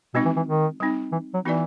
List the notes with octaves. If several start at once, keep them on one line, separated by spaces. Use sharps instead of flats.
B2 G#3 C4 D#4 F#4
E3
E3
D#3
G3 C4 D#4
E3
F#3
E3 B3 D#4 F#4 B4 D5